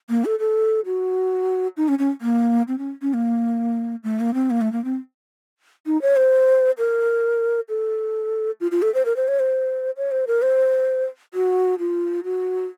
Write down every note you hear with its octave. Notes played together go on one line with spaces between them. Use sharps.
A#3
A4
A4
F#4
D#4
C#4
C#4
A#3
C4
C#4
C#4
A#3
A3
A#3
C4
A#3
A3
A#3
C4
D#4
C#5
C5
A#4
A4
F4
F4
A4
C5
A#4
C5
C#5
C5
C#5
C5
A#4
C5
F#4
F4
F#4